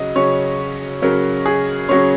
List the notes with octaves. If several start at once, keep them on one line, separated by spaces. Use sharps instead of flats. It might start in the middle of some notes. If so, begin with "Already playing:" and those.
Already playing: C#3 F#3 D#5
C#3 F#3 C#4 C#5
C#3 F#3 C#4 A#4
G#4
C#3 F#3 C#4 C#5